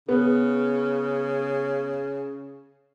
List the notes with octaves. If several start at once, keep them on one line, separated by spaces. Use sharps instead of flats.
C#3 B3